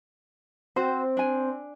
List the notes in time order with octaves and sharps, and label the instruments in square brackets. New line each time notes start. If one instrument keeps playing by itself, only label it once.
[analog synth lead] C4 [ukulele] F#4 C5
[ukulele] D4 G#5